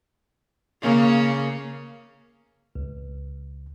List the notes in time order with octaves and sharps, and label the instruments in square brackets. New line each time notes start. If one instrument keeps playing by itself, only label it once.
[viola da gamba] C#3 A#3 C#4
[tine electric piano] C#2